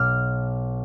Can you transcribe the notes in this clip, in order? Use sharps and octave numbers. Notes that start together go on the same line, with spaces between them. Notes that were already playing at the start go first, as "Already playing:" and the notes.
Already playing: B1 B2 D6 F6